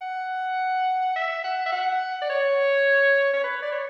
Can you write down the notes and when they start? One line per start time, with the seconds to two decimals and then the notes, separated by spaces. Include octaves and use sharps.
0.01 F#5
1.16 E5
1.44 F#5
1.66 E5
1.72 F#5
2.22 D5
2.30 C#5
3.33 C#5
3.44 B4
3.62 D5
3.72 C#5